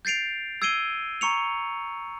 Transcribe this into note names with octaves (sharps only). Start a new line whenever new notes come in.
G6 A6 C7 D7 F7
E6 G#6 C7 D7 D#7 G7
A#5 C#6 C#7 F7